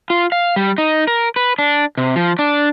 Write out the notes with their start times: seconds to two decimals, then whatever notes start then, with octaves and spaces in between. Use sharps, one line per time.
0.10 F4
0.32 F5
0.56 G3
0.78 D#4
1.08 A#4
1.36 B4
1.59 D4
1.97 C3
2.16 F3
2.39 D4